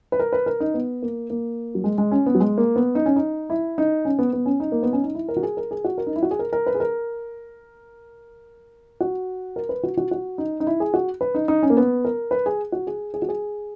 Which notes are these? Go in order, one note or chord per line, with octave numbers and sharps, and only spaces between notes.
B4
A#4
B4
A#4
D#4
B3
A#3
A#3
F#3
G#3
G#3
C#4
B3
F#3
G#3
A#3
B3
D#4
C#4
D#4
E4
D#4
C#4
B3
B3
C#4
D#4
A#3
B3
C#4
D#4
E4
A#4
F#4
G#4
A#4
G#4
F#4
A#4
D#4
E4
F#4
G#4
A#4
A#4
B4
G#4
A#4
F#4
A#4
B4
F#4
F#4
F#4
D#4
D#4
E4
G#4
F#4
B4
D#4
D#4
C#4
A#3
B3
A#4
B4
G#4
F#4
G#4
G#4
F#4
G#4